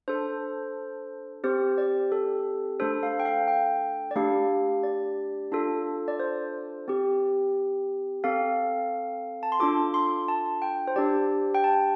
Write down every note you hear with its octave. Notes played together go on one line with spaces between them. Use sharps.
D4 A4 C5
C4 G4 C5
D5
A4
A3 D4 A4 C5
F5
G5
F5
G5
D5
A3 D4 G4 F5
D5
D4 F4 A4
D5
C5
C4 G4
C4 A4 F5
A5
C6
D4 F4 A4 D6
C6
A5
G5
C5
D4 G4 D5
G5
A5